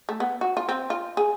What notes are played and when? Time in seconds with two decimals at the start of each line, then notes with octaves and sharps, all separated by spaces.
0.09 A3
0.20 B3
0.41 F#4
0.57 F4
0.69 C4
0.90 F4
1.17 G#4